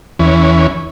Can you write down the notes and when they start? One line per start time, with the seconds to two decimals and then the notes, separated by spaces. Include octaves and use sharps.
0.19 E2 E3 C#4